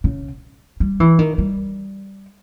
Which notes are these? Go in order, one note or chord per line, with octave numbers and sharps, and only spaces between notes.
C#3
G3
E3
D#3
G3